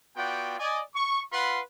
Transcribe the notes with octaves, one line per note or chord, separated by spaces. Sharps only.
B3 F4 F#4 D5 G5
D5 D#5 G#5
C#6
F4 B4 F5 F#5 B5 C6